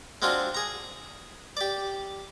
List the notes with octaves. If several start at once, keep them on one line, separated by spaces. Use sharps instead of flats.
G#3 C4 D4 F4 F#4
G#4 A#5
G4 D5